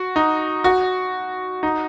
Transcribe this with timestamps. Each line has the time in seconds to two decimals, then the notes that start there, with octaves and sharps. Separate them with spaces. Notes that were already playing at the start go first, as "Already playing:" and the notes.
Already playing: F#4
0.16 D#4
0.64 F#4
1.63 D#4